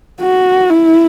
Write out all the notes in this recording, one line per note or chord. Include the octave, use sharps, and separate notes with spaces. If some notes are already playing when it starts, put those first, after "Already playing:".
F#4
E4